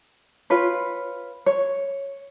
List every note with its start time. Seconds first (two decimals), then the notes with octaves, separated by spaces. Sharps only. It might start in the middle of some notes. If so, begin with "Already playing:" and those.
0.50 F4 B4 C#5
1.46 C#5